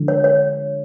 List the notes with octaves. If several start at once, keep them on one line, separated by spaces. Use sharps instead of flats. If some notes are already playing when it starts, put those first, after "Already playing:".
Already playing: D3 F3 G#3
C#5
C#5